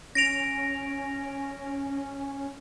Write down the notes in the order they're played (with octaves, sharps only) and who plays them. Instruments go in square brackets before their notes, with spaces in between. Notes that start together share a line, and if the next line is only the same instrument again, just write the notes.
[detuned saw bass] C#4 [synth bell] A#6 D7 F7